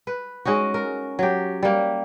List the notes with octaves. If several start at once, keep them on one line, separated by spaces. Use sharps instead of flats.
B4
G#3 C#4 D#4 F#4
A#4
F#3 G4
G3 A#3